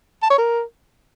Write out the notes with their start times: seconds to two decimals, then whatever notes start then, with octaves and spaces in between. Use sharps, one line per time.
0.23 A5
0.30 C#5
0.38 A#4